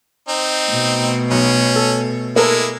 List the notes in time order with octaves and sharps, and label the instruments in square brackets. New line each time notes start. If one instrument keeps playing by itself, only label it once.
[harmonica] C4 D#4
[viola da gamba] B2 A3
[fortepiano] B1 [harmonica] C#4
[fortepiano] A4
[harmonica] G#3 E4 [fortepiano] A#3 A4 A#4